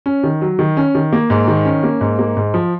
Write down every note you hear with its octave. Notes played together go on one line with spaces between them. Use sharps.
C#4
D#3
F#3
D#3
C#4
D#3
A#3
G#2
D#3
C#4
A#3
G#2
A#3
G#2
F3